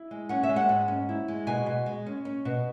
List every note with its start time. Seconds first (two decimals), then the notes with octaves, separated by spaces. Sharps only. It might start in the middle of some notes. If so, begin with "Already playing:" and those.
Already playing: E4
0.11 G#3
0.29 C#4 F#5
0.43 E5
0.49 G#3
0.56 F#5
0.69 G#2
0.88 C#4
1.09 E4
1.28 G#3
1.47 B2 G#5
1.66 B2
1.86 G#3
2.06 C#4
2.25 C#4
2.45 B2